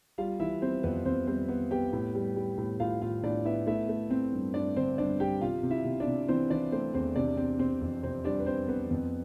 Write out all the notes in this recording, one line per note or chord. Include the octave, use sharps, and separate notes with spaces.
G3 F4 F5
E3 E4 E5
G3 C4 C5
F2 B3 B4
F2 C4 C5
G3 C4 C5
B3 B4
B3 G4 G5
A2
G3
G3
A2
A2 F4 F5
A2 F4 F5
A2 D4 D5
B3 E4 E5
A3 E4 E5
A3
C4
G2
G2 D4 D5
D3 C4 C5
G2 D4 D5
G2 G4 G5
C3 F4 F5
C3
E4 E5
C3
D4 D5
C3
E3 C4 C5
E3 D4 D5
A3 C4 C5
E2 C4 C5
C3 D4 D5
C4
C3 C4 C5
F2
C3 C4 C5
G3 D4 D5
B4
C4 C5
B3 C4 B4
F2